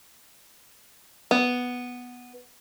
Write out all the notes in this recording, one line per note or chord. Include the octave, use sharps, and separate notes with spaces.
B3